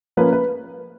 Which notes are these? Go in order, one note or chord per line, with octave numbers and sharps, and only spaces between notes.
F3 A#3 C#4 B4
B4